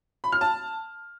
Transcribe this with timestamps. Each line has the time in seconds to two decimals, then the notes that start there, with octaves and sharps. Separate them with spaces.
0.24 B5
0.32 F6
0.41 A5